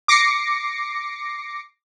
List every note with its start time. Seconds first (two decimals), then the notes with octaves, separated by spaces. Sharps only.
0.08 D6 A#6 C7 C#7